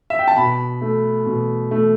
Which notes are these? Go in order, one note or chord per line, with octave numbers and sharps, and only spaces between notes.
E5
G5
A5
B2 B5
A3
B2
A3